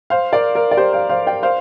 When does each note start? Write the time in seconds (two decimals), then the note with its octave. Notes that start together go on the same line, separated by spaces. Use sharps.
0.10 C5 F5
0.32 A#4 D5
0.55 A#4
0.71 D5
0.77 G4 C5
0.93 C5 F5
1.09 C5 F5
1.27 D5 G5
1.43 C5 F5